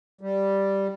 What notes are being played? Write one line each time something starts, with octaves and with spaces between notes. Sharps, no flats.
G3